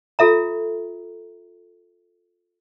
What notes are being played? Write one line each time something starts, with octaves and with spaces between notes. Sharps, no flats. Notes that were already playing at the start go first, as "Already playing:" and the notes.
F4 A4 E5 A#5